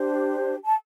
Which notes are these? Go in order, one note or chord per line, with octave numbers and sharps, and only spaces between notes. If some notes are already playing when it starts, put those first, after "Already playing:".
Already playing: D4 G4 C5
A5